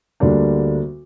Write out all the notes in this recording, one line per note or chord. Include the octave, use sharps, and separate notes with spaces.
D2 D3 G3 A#3 D4